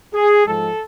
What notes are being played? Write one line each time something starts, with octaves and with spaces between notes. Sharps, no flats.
G#4
G#2 F3 G#3 A4